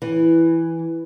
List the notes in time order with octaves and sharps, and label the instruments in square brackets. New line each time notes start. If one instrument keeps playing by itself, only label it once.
[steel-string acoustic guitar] E3